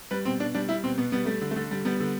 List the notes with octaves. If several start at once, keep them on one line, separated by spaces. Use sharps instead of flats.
G3 B4
B2 C4
B2 D4
G3 D4
G3 E4
B2 C4
B2 B3
G3 B3
G3 A3
D3
A3
D3
G3
G3 B3
D3